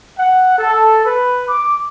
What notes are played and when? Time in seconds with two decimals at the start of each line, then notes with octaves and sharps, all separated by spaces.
0.17 F#5
0.58 A4
1.04 B4
1.47 D6